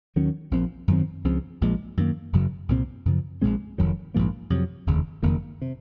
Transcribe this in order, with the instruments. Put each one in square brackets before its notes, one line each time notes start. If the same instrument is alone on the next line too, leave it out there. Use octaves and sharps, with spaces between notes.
[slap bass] D#2 D#3 F#3 C#4
A#1 A#2 F3 C4
F#2 D#3 F#3 C4
C#2 C#3 F3 C4
A#1 A#2 F3 G#3
F#2 D#3 A#3
F#1 F#2 C#3 F#3
C2 A#2 G#3 C4
F#2 C#3 F3
A#1 A#2 G#3 C4
F1 F2 D#3 F#3
A#1 G#2 F3 A#3
F2 C3 F#3
F1 D#2 C#3
F#1 F2 D#3 A#3
C3